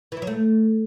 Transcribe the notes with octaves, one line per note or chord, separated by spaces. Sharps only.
E3
E4
F#3
A3